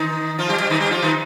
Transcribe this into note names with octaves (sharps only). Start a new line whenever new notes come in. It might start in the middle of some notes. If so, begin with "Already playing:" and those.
Already playing: D#3 D#4
F3 F4
G3 G4
G3 G4
D#3 D#4
G3 G4
F3 F4
D#3 D#4